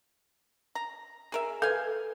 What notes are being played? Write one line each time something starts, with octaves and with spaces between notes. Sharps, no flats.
A#5
G#4 A#4 E5
A4 B4 F5 G#5